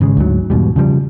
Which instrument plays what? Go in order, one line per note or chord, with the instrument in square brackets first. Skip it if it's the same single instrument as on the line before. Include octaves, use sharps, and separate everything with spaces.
[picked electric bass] G#1 C#3 G#3
D2 G#2 F#3
E2 G#2 B2 G3
C#3 F3 G3